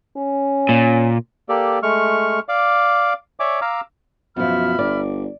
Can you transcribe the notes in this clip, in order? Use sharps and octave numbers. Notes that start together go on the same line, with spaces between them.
C#4
A#2
A#3 G4 A4 D5
G#3 A3 C#6 F6
D5 F5 D6
C#5 D5 E5 G#5 D6
F5 A#5 D6 E6 F6
F#2 B2 F3 E5 B5 F6
G1 D5